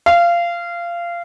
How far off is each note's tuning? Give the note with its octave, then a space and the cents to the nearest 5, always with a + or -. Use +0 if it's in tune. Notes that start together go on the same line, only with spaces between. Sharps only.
F5 -20